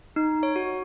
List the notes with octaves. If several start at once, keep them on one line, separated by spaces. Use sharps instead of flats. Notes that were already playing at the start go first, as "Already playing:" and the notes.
D#4
C#5
F#4